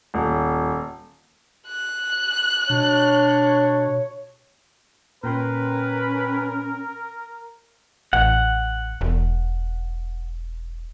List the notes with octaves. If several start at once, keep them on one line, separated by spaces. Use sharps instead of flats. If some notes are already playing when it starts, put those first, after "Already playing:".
D#1
F#6
B2 D4 C#5
A#2 C#4 A#4 B4 G5 C6
A1 F#5
E1